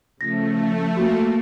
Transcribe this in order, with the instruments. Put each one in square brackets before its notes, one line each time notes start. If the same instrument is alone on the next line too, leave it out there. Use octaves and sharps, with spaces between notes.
[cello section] C#3 [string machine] F3 [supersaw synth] A3 [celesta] A#6
[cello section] A#3 [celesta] F#4